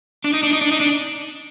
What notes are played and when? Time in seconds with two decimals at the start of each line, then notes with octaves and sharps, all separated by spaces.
0.24 D4
0.33 D#4
0.43 D4
0.53 D#4
0.61 D4
0.72 D#4
0.80 D4